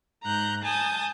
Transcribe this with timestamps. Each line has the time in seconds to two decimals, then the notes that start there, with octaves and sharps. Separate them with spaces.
0.24 G#2 A#5 F#6 G6
0.63 G#5 A5 D#6 G6